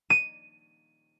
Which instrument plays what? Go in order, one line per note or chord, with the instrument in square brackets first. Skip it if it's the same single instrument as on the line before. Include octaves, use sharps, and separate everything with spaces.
[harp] D#7